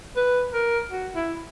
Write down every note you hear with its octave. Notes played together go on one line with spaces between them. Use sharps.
B4
A#4
F#4
E4